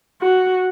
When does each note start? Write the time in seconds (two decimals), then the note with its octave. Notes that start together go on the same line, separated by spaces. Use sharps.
0.21 F#4